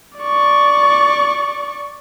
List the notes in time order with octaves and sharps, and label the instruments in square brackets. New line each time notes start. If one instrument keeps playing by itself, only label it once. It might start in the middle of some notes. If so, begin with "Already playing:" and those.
[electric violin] D5 C#6